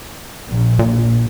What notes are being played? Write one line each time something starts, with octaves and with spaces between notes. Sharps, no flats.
A#1
A#2